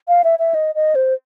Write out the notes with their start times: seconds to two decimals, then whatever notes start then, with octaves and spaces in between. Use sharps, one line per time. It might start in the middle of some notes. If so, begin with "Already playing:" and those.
0.08 F5
0.24 E5
0.39 E5
0.54 D#5
0.75 D#5
0.95 C5